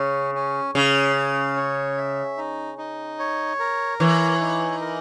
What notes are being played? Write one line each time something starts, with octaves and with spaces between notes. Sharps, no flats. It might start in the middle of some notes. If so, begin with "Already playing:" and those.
Already playing: C#3 C#4
C#4
C#3 C#4
C#4
C#5
E5
D#4
D#4
C#5
A#4
E3 C#5
D#4
A#4